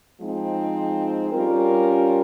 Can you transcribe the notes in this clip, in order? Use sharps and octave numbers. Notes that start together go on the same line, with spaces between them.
F3 G#3 C4 D#4
G3 C#4 F4 A#4